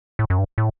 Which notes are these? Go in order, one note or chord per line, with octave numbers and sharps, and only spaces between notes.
A2
F#2
G2
A2